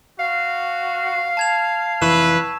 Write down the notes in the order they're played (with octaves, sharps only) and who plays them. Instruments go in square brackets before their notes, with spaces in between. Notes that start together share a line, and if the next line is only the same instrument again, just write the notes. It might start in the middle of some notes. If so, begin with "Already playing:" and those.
[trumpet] F#4 [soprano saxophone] F5
[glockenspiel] A5 G#6 F7
[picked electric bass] F1 E3 [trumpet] B4 [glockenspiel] C#6 E6 E7